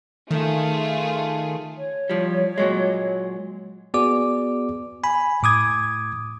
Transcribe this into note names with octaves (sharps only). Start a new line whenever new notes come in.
D#3 A3 F4 G#4
C#5
F3 G3
A#2 F#3 G#3
B3 F#4 G#4 D5 D6
G#5 B5
A2 D6 D#6 G#6